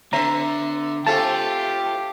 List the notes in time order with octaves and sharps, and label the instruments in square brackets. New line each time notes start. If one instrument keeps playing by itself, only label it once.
[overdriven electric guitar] D3 [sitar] B3 E5 [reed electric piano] A#5
[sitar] A3 C4 A4 [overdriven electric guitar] F4 [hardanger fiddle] G4 [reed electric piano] A5